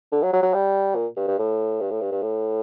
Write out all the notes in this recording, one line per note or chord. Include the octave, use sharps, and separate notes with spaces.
D3
F#3
F#3
F#3
G3
A#2
G2
G2
A2
G2
A2
G2
G2
A2